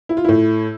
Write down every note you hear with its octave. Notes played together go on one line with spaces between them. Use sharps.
E4
F4
A2 E4